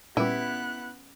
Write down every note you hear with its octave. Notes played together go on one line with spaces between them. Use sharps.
A#2 G3 B3 C#4 E4 B4 F#6